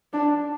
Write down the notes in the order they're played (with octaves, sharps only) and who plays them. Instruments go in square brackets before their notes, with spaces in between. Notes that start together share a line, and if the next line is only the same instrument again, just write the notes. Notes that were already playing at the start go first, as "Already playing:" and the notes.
[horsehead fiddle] D4